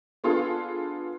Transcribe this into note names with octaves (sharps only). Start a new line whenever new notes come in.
B3 D4 F4 G#4 A4